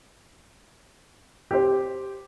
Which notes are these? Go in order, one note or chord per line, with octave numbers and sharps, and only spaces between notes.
G4 C5